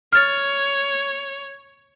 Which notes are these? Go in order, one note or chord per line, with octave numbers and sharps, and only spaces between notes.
C#5 F6 A6